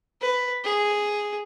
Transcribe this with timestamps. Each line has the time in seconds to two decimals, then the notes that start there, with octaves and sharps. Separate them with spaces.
0.22 B4
0.65 G#4